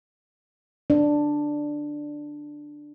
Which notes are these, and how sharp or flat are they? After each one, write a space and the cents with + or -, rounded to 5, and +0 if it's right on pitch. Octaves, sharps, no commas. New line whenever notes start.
D4 +5